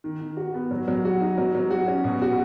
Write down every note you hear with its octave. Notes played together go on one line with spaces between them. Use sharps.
D#3
D#3
F#4
B3
F#3
F#3
F#4
D#4
F#3
F#3
F#4
C#4
B2
F#4